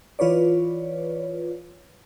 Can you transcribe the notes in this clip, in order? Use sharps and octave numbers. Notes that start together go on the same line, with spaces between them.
E3 F4 B4 C#5 D5